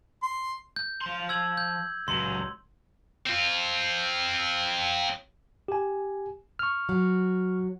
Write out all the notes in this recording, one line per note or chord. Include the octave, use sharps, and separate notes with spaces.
C6
G6
F3 C6
E6 G#6 F#7
G6
C#2 F#3 C6
C4 F4
G4 G#5
C#6 F6
F#3